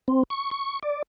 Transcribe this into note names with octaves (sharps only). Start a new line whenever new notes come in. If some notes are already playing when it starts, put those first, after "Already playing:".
C4
C#6
C#6
D5